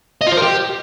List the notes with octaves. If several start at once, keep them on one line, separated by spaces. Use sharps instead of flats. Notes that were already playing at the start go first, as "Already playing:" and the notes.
D#5
F4
C5
A#4
G4